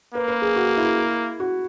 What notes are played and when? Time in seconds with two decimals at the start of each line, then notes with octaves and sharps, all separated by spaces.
0.14 A#3 B4
0.28 B4
0.42 G#4
0.56 F#4
0.77 E4
1.40 F#4